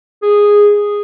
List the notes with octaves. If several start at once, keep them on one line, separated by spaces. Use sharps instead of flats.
G#4